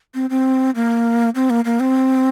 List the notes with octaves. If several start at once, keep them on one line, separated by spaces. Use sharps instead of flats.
C4
C4
A#3
C4
A#3
A#3
C4